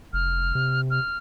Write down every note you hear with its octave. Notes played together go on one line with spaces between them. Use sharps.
F1 F6
C3
F6